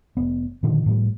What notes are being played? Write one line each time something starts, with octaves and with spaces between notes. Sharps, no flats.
F1 B3
A#2 D3 D#3 F3
A2 F3 G3